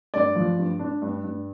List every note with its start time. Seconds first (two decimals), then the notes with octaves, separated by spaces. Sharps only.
0.14 G2 D5
0.36 F3
0.58 G2
0.79 D4
1.02 G2
1.23 G2